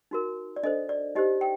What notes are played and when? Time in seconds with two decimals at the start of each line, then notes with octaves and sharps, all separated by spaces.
0.11 D#4 F#4 A#4
0.56 D5
0.63 D4 A4 C5 D#5
0.89 D5
1.15 D#4 G4 C5 D#5
1.41 G5